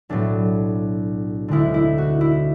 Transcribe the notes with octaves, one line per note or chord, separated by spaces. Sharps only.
B1 A2 F#3 D4
D2 D3 G#3 E4
E4
F#4
E4